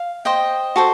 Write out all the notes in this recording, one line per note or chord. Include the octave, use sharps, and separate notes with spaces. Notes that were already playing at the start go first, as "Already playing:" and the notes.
Already playing: F5
C5 D#5 G5
F#4 A4 C5